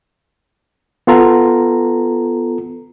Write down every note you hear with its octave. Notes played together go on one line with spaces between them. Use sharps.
B3 F4 A4 A#5